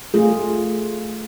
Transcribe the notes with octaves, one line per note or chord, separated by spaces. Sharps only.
A3 F4 G#4